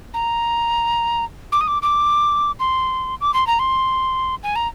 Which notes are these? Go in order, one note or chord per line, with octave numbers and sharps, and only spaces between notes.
A#5
D6
D#6
D6
D6
C6
D6
C6
A#5
C6
G#5
A#5